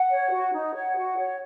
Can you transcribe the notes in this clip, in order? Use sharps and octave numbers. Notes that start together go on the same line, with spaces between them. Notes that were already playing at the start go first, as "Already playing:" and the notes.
Already playing: F#5
C#5
F#4
D#4
C#5 F#5
F#4
C#5